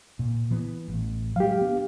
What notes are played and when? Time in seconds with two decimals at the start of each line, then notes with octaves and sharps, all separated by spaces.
0.19 A#2
0.51 E3 B3
0.88 A1
1.36 F#3 G#3 G4 F5
1.61 B3 D4